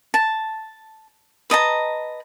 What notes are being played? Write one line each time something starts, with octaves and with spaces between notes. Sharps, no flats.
A5
B4 D#5 A5 A#5